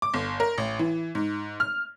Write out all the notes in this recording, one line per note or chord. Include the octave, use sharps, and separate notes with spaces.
D6
G1
A#4
A1
E3
G#2
F6